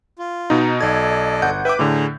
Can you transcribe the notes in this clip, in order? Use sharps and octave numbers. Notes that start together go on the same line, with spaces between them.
F4
B2 D#4
B1 A4 D5 D#5 G#6
G1 F#5 G6
B4 E5 G5 D6
A2 D3 G#4 A#5